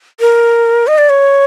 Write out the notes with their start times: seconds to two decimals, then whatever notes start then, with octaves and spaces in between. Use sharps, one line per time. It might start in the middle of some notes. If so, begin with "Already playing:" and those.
0.20 A#4
0.87 D#5
0.98 D5
1.09 C#5